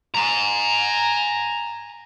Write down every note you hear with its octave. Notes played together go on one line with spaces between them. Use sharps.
G#5 A#5